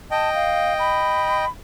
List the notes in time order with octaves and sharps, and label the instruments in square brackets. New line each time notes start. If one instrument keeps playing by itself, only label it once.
[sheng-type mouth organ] D#5 G5 [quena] A5
[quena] F5
B5